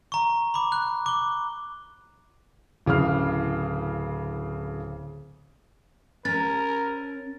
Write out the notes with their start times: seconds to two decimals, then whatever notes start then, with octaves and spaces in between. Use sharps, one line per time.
0.12 A#5 C#6
0.54 B5 D6
0.72 F#6
1.06 D6 G7
2.86 D1 C#3 E4 F5 F6
6.25 C#4 A#4 A6